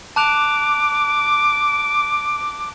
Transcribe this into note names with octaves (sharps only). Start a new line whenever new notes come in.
A5 D6 F#6 F7